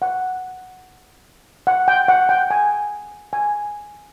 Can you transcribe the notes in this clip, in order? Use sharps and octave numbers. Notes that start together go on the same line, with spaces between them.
F#5
F#5
G5
F#5
G5
G#5
G#5